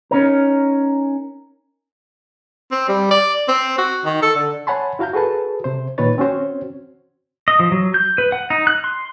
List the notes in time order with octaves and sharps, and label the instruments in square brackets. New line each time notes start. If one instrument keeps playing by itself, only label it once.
[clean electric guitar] C#4 D#4 A#4
[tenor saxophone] C4
G3
D5
C4
F#4
D#3
A4
D3
[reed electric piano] C#5 F#5 G#5 A5 B5 C6
E4 F#4 F5 A#5 G6
F#4 G#4 A4 B4 A5
C3 C5
A#2 D#3 B4 C#5 A6
C4 C#4 F#4 C5 C#5
[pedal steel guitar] D#5
F3
F#3
G6
B4
F#5
D#4
F#6
C6